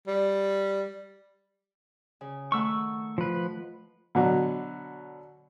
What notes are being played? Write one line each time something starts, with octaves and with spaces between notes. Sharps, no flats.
G3
C#3
D#3 A3 F#5 C#6 E6
F3 B4
B2 D3 F#3